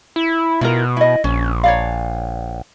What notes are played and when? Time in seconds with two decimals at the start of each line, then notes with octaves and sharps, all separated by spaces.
0.16 E4
0.61 B2 E4 F4 A#4
0.97 E4 D#5
1.24 A#1 C#4
1.64 C#5 D5 F5